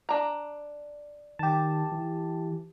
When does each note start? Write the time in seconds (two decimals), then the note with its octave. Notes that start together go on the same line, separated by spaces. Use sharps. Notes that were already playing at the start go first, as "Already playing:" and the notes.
0.09 D4 A#5
1.39 D#3 G4 A5
1.92 E3